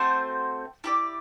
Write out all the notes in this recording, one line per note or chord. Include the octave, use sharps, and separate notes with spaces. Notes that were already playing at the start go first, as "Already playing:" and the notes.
Already playing: A3 C4 F#4 C5
E4 G4 D5